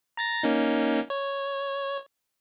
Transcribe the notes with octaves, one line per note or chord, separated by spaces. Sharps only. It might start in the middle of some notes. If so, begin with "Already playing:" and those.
A#5 A6 A#6
A#3 C#4 D#4
C#5